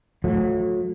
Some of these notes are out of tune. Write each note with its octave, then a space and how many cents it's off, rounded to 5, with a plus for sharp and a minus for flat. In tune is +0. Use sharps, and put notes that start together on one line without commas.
F#3 -35 A3 -10